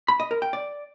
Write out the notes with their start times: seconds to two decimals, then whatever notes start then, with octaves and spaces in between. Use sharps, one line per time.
0.08 B5
0.20 D#5
0.31 A#4
0.42 G5
0.53 D5